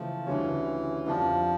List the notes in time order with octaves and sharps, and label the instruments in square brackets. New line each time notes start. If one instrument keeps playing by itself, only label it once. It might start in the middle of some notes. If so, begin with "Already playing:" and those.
Already playing: [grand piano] C#3 E3 A3 [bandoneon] F3
[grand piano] D2 D3 G3 C#4 [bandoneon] E3
[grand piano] F2 D3 G3 D4 F4 [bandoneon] F3